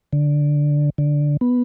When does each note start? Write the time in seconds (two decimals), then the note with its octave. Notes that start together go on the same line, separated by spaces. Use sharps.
0.13 D3
0.98 D3
1.41 B3